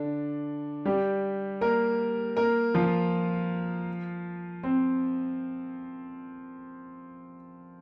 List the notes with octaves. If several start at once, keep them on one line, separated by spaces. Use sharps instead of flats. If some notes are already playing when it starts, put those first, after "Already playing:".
Already playing: D3 D4
G3 G4
A#3 A#4
A#3 A#4
F3 F4
C4